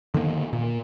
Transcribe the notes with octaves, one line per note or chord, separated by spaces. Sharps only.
D3 D#3 A3 A#3
A#2